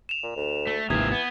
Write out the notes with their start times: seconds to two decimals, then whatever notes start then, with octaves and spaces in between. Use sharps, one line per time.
0.09 E7 F7
0.23 A#2
0.36 D2
0.67 A3
0.90 G#1 D#2 C3 E3 F3 D#6 G#6
1.12 B3